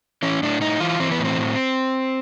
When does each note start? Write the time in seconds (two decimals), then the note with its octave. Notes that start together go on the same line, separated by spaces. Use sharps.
0.22 E3 C#4
0.43 A2 D4
0.61 A2 D#4
0.80 E3 F4
1.00 E3 C4
1.11 B3
1.19 A2
1.25 C4
1.38 A2